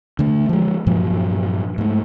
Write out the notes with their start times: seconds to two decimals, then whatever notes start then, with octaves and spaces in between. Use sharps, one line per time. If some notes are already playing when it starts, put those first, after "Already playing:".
0.19 D3 A3
0.49 F3 G#3
0.86 G2 A#2 F3 F#3
1.78 G#2 A3